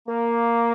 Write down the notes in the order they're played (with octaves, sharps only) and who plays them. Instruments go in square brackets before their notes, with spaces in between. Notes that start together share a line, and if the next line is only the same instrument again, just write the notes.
[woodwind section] A#3